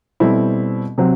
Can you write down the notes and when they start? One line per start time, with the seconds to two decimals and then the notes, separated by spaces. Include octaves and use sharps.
0.20 B2 G3 C4 E4 A4
0.98 C3 F#3 C4 F#4